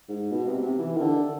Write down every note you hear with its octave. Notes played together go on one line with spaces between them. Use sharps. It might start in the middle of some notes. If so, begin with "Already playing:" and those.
G#2
B2
C3
C3
E3
D#3
D3